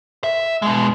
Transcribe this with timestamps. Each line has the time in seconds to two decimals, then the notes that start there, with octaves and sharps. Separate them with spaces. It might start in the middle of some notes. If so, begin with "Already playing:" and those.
0.24 E5
0.62 B2 G#3